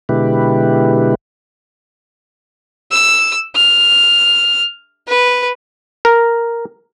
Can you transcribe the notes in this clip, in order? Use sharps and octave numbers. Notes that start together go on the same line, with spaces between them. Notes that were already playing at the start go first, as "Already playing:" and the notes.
B2 D3 G#3 E4 G4 B4
E6
F6
B4
A#4